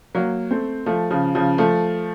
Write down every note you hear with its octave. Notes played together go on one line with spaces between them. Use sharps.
F#3 A#3
A3 C4
F3 A3
C#3 F3
C#3 F3
F3 A3